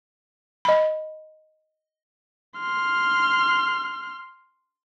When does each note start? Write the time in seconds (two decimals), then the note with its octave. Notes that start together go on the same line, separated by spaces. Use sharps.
0.65 D#5 B5
2.60 C6 F6